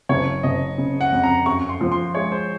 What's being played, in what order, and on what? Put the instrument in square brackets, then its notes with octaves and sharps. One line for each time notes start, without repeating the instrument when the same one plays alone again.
[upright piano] F#1 [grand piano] C#5
[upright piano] F#1 [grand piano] D#5
[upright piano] C#3
[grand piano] F#5
[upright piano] F2
[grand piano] A#5
[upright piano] F#2 [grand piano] C#6
[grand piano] C6
[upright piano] F3
[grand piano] C6
[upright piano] G#3 [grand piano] C#5
[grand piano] C5